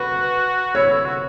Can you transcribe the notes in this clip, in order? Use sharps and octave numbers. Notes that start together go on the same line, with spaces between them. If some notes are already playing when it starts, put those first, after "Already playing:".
Already playing: F#4 B4
E4 C#5
E4
F#4